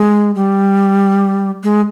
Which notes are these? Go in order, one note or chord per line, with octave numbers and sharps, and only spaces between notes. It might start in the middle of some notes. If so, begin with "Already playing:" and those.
Already playing: G#3
G3
G#3